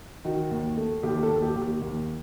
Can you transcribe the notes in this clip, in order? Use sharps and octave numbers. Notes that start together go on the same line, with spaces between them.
D#3 F#4
D#2
A3
D#2 G4
A4
D#2
G4
D#2
G4
D#2